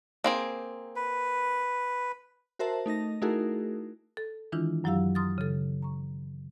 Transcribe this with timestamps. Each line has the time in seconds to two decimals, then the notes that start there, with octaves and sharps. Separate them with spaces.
0.24 A#3 C4 G#4
0.96 B4
2.59 F#4 A#4 C5 E5 A5
2.86 A3 D#4 D#5 A#6
3.22 A3 D#4 E4 F#4 G#4 A#4
4.17 A4
4.52 D#3 E3 G#3 D4 E4 F4
4.84 F#2 F#3 E4 G4 F5 E6
5.15 A#5 C6 D#6 F6 A6
5.38 C#3 A4
5.82 A#5 C#6